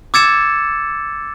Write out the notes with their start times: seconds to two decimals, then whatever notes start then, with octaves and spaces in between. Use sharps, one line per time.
0.14 D6 E6 G#6 A6 C#7 E7